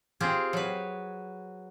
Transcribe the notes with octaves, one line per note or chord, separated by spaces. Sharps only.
C4 F4 G4 G#4
F#3 B4